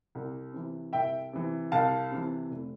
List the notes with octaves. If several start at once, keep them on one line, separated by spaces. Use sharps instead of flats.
C2
C3 E3
C2 E5 G5
C3 E3
C2 F5 A5
C3 E3
F1